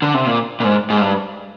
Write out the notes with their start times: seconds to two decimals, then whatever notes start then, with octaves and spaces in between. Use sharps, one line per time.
0.02 D3
0.14 C3
0.27 A#2
0.60 A#2
0.64 G#2
0.90 G#2
1.01 G2